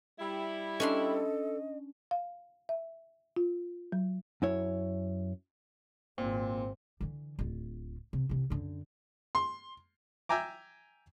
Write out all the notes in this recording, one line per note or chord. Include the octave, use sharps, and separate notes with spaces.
G3 E4
C#4 D4 A4 D#5 C6
F5
E5
F4
F#3
F#2 E4 C#5
G#1 A#2 C4
D3 E3
D1 F4
C3
C3 E3
F#2 D3
C6
E5 G5 G#5 A#5 D6